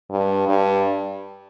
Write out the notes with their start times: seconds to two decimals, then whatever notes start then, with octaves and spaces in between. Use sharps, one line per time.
0.10 G2
0.48 G2